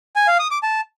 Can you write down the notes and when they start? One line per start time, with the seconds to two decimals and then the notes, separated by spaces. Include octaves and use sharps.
0.16 G#5
0.28 F5
0.39 D#6
0.51 D6
0.63 A5